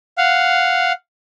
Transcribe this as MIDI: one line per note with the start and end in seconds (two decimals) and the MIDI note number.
0.18 0.92 77
0.18 0.92 78